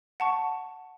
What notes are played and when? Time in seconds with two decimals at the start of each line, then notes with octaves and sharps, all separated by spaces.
0.20 F#5 A5 C#6